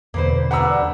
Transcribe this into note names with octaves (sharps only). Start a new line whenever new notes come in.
E2 B2 D3 A#3 B4 C5
G3 D4 B4 F#5 A#5 E6